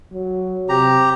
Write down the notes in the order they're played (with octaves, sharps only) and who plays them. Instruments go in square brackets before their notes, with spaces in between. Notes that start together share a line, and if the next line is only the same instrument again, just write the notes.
[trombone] F#3
[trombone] C3 [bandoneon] G4 A#5